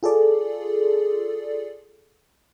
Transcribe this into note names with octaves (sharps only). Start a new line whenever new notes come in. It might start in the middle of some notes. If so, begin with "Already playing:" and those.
F4 G#4 A4 D5